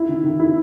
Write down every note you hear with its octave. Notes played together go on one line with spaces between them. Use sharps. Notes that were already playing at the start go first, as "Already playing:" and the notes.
Already playing: E4
D#3
D#3
E4